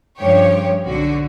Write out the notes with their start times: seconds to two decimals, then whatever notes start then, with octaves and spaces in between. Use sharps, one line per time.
0.18 G2 C#3 F3 G4 C#5
0.84 B1 D3 F#4